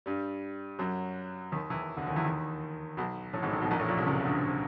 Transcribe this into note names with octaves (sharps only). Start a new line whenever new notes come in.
G2 G3
F#2 F#3
D#2 D#3
E2 E3
D2 D3
D#2 D#3
E2 E3
D#2 D#3
B1 B2
A1 A2
G#1 G#2
A1 A2
B1 B2
A#1 A#2
A1 A2
A#1 A#2
C2 C3
C#2 C#3
D2 D3